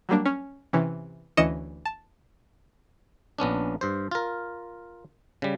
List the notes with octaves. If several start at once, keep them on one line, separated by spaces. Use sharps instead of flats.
F#3 G3 A#3 D4
C#4
C3 E3 C#4
D2 E3 C#4 D#5 C#7 E7
A5
A#1 B3 C#4 D4
G2 C5
F4 A#4
C#3 G3